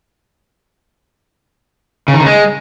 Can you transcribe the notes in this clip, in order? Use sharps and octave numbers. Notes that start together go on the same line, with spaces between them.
C#3
D#3
C#3
G#3